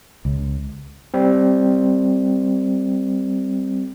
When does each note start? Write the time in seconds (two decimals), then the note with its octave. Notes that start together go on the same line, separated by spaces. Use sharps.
0.25 C#2
1.14 G3 C4